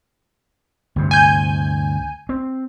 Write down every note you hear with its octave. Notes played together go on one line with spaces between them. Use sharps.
D2 G2 C3
G#5 G6
C4